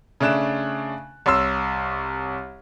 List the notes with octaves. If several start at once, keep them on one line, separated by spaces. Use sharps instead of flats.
C#3 A3 D4 F#6 E7
C2 C#5 C6 E6